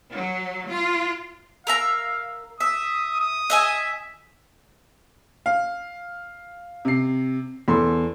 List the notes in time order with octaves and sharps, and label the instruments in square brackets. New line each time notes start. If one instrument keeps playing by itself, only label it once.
[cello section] F#3
F4
[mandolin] A#4 E5 A#5 [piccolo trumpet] F5
[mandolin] E5 [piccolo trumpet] D#6
[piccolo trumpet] D#6
[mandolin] D#5 E5 G#5
[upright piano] F5
C3 C7
E2 A4 C6